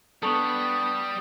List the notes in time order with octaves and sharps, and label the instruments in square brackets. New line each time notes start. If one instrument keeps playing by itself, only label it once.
[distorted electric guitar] G3 [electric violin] B3 D4 [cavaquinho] A4 C#6 [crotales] D#6